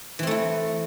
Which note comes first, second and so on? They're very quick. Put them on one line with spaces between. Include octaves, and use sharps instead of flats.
E3 C4 A3 E4